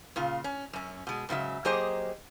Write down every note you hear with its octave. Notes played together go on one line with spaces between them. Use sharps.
A#2 C#3 F4
C#4
F#2 C#4
B2 G#3
G#2 C#3 F#3 E5
F#3 A#3 G4 G#4 C5 D#5